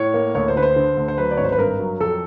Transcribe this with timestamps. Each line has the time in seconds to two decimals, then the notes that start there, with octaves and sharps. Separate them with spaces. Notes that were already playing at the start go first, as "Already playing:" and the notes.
Already playing: A2 C#5
0.14 A#3
0.35 D2 C#5
0.48 C5
0.56 D3 B4
0.63 C5
0.76 D3
0.97 D2
1.08 C5
1.18 F#3 B4
1.31 D5
1.37 G#1 C#5
1.45 C5
1.52 B4
1.59 G2 A#4
1.79 F#3
2.00 F2 A4